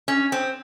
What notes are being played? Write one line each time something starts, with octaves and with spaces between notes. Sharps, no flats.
C#4
C4